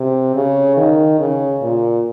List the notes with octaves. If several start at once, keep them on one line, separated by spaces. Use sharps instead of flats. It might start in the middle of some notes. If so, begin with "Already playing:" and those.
Already playing: C3
C#3
D#3
C#3
A#2